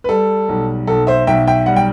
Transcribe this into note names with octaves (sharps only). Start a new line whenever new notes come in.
B4
G3 A4
B1
B1 A4
C5 E5
B1 E5 G5
E5 G5
G3 F#5
G5